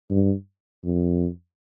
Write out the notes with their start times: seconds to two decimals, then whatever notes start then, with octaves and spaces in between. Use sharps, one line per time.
0.11 G2
0.84 F2